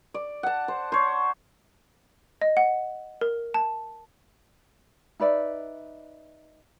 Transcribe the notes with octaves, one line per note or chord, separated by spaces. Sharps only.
D5
F#5 A5
C5
C5 C#5
D#5
F#5
A#4
A5
D#4 B4 D5 E5